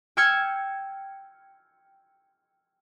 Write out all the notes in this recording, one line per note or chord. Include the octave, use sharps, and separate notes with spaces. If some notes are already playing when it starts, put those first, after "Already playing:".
G5 E6 F6 G#6 C#7